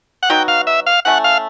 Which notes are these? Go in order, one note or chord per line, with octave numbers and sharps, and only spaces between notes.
F#5
F#3 B3 D#4 F#4 G5
F5
E5
F5
A3 C#4 E4 F#5
F5